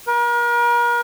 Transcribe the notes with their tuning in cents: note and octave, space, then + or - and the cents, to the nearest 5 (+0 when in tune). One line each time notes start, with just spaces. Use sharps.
A#4 +40